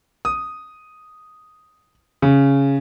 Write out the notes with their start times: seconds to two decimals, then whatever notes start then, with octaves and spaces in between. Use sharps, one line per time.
0.25 D#6
2.22 C#3